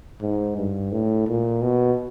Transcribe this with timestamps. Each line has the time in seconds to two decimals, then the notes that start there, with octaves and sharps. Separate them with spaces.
0.21 G#2
0.57 G2
0.92 A2
1.28 A#2
1.62 B2